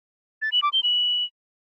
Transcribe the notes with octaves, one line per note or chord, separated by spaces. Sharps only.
A6
F#7
D6
G7
F#7